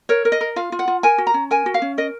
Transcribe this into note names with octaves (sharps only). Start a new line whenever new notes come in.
A#4 C#5
A#4
D#5
A#4
F4 F5
F4
F#5
F4
A#4 G#5
F#4
A#5
C#4
A#4 G#5
F#4
F5
C#4
A#4 D#5